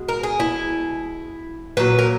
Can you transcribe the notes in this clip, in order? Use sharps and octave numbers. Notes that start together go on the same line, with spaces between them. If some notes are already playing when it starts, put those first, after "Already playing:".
Already playing: B2 G#3
A#4
G#4
E4
A#2 F#3 B4
A#4